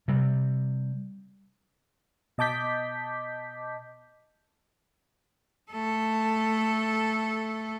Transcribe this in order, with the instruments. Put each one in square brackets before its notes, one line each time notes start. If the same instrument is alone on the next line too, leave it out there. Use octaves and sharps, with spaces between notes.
[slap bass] C3 G3
[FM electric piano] B2 D#5 A5 D6 G6 B6
[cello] A3 A4